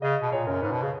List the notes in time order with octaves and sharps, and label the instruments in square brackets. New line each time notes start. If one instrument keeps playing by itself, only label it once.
[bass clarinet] C#3 [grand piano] D#5
[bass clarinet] B2
[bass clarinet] A#2 [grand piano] C#5
[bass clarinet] F#2 [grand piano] A#4
[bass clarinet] G#2 [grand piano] B4
[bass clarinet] B2
C#3